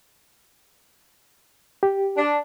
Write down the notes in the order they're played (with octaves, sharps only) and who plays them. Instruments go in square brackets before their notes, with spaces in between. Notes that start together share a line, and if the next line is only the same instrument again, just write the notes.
[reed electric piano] G4
[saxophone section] D4